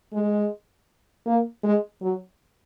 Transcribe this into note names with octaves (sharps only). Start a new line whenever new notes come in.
G#3
A#3
G#3
F#3